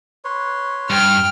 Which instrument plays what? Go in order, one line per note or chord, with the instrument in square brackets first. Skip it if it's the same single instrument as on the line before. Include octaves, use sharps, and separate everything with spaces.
[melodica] B4 C#5 C6
[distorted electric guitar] G2 [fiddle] G5 F6